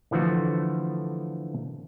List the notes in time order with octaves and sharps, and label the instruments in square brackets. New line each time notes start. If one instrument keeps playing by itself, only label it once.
[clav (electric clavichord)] D3 E3 F3 A3 F#4